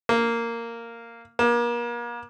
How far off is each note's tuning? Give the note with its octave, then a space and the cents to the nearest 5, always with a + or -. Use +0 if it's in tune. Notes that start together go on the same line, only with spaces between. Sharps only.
A#3 -10
A#3 +35